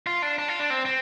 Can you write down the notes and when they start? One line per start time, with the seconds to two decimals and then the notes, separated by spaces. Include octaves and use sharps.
0.07 F4
0.22 D4
0.38 D4
0.48 F4
0.59 D4
0.70 C4
0.86 C4